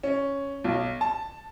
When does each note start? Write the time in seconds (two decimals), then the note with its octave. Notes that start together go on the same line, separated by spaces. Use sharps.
0.03 C#4
0.64 B1
1.01 A5